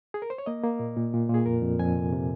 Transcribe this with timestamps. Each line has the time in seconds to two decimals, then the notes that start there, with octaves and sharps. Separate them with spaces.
0.14 G#4
0.22 A#4
0.30 C5
0.38 C#5
0.46 A#3 D#5
0.64 A#3
0.79 A#2
0.96 A#2
1.14 A#2
1.29 A#2 G#4
1.46 F2 A#4
1.63 F2
1.79 F2 G#5
1.96 C3
2.12 C3